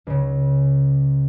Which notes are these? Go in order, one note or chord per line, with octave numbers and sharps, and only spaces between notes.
C#2 C#3